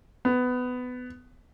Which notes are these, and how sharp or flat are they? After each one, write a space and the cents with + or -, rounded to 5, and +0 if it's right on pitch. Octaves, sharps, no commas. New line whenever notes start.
B3 +20